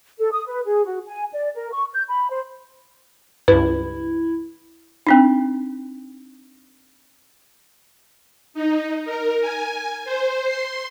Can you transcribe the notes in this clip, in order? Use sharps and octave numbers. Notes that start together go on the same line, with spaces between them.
A4
D#6
B4
G#4
F#4
G#5
D5
A#4
C#6
G6
B5
C5
C#2 G2 E4 B4
C4 D4 D#4
D#4
A#4
G#5
C5
C6